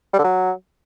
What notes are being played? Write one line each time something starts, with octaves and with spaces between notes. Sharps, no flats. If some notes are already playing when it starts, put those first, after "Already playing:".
G3
D3
F#3